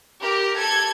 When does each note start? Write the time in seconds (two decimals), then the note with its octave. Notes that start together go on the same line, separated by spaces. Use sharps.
0.20 G4 A#4
0.55 A4 G#6